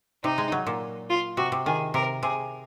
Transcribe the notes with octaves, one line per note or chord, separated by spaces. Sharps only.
C3 D#4
G#3
F#3
A#2
F4
C3 F#4
C3
D#3 G#4
C3 A#4
C3 G#4